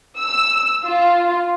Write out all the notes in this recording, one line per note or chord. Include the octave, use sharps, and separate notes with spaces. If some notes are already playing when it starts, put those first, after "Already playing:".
E6
F4